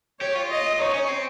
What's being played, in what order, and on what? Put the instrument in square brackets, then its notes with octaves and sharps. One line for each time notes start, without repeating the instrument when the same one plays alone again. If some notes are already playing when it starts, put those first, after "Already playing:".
[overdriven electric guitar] G4 [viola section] C#5
[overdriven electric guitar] F4
[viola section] D#5
[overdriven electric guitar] D#4 [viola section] C#5
[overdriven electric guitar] C#4
C4